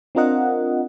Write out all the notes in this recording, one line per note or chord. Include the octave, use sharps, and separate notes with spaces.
C4 D4 F4 A#4 D#5 F#5